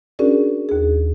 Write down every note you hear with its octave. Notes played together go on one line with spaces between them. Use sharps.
C#4 D4 F#4 G#4 A#4 D5
D#2 G#4